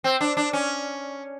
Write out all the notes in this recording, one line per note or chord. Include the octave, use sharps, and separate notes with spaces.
C4
D4
D4
C#4